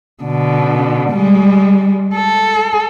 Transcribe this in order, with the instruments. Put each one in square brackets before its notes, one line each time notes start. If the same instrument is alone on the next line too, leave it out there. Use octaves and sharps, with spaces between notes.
[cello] B2 D3
G3 G#3
A4